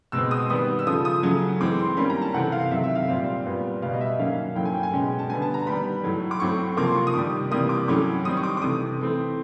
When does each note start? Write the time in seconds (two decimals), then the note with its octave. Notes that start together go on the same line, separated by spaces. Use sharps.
0.12 B2 G#3 C4 E6
0.31 D#6
0.50 D#3 G3 B3 D#6
0.79 E6
0.86 C#3 F3 A3 D#6
1.05 D#6
1.23 C#3 F#3 A3 C#4
1.61 A2 E3 G#3 C4 D6
1.79 C6
1.97 D#3 G3 A#3 C#4 B5
2.10 A#5
2.22 A5
2.34 C3 E3 A3 C4 F#5
2.52 F5
2.71 C3 D#3 F#3 A3 E5
2.84 E5
2.95 F5
3.08 A#2 G3 C4
3.45 A#2 G3 B3
3.82 B2 G3 B3 F5
3.94 D#5
4.01 E5
4.19 D#3 F#3 A#3 C#4 F5
4.55 A2 F#3 A#3 C#4 G5
4.65 G#5
4.74 G5
4.83 G#5
4.92 B2 G#3 C#4 G5
5.19 A5
5.30 D3 G3 B3 G#5
5.42 A5
5.54 A#5
5.66 D#3 G3 B3 B5
6.03 A2 F#3 A3
6.31 D6
6.40 A2 F#3 A3 C4 C#6
6.77 C3 F3 A#3 D6
6.86 C6
6.96 C#6
7.07 D#6
7.14 C3 D#3 G3 D6
7.51 C3 E3 G3 A#3 D#6
7.69 D6
7.88 A2 F#3 A3 C#4 D6
8.25 D#3 G3 C4 D#6
8.37 C#6
8.43 D6
8.57 D6
8.62 C3 E3 A3 C4 D#6
8.99 E3 A3 C4